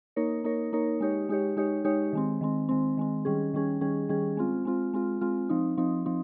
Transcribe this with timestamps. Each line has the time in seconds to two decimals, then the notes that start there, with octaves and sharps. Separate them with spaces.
0.16 A#3 D#4 A#4 C#5
0.44 A#3 D#4 A#4 C#5
0.73 A#3 D#4 A#4 C#5
1.00 G#3 D#4 G4 C#5
1.29 G#3 D#4 G4 C#5
1.57 G#3 D#4 G4 C#5
1.85 G#3 D#4 G4 C#5
2.13 D#3 G#3 C4
2.41 D#3 G#3 C4
2.69 D#3 G#3 C4
2.97 D#3 G#3 C4
3.25 D#3 G3 C#4 G#4
3.54 D#3 G3 C#4 G#4
3.81 D#3 G3 C#4 G#4
4.09 D#3 G3 C#4 G#4
4.37 G#3 C4 F4
4.65 G#3 C4 F4
4.93 G#3 C4 F4
5.21 G#3 C4 F4
5.49 F3 C4 D#4
5.77 F3 C4 D#4
6.06 F3 C4 D#4